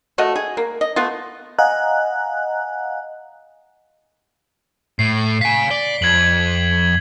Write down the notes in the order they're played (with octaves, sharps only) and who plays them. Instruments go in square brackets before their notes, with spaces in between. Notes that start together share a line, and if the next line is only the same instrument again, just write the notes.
[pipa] F3 A3 F#4 D#5
G#4
A#3
D#5
A3 B3 F4
[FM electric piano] D#5 F5 F#5 G#5 A#5 F#6
[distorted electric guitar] A2 [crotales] C7
[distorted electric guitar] F5 G#5 [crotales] B6
[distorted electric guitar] D5 [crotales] G7
[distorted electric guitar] F2 [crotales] G#6 F#7